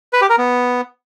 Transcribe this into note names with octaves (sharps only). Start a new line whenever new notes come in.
B4
G4
A#4
B3